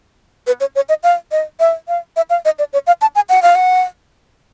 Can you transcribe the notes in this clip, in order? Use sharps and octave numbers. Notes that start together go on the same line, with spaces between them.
B4
C#5
C#5
D#5
F5
D#5
E5
F5
E5
F5
D#5
D5
C#5
F5
A5
G#5
F#5
F5
F#5